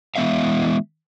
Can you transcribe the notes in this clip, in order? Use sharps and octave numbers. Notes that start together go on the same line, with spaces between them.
E3 G#3 B3 E5 F5